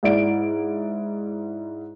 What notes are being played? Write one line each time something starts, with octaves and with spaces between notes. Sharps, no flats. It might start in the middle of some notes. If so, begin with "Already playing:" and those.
G#2 E4 D5 D7